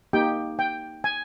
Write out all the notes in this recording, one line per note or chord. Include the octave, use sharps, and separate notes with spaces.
A#3 D#4 G4 G5
G5
G#5